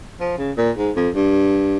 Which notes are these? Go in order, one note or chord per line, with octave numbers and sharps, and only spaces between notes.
F3
C#3
A#2
G#2
F2
G2